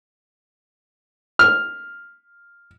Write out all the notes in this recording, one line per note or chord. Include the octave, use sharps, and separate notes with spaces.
F6